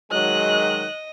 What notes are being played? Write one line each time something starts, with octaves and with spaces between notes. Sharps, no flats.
D#3 F#3 G#3 D#5 F#6